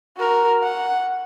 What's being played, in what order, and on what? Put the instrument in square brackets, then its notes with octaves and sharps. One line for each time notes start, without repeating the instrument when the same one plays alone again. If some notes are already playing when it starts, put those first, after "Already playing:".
[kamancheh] F#4 A#4
F#5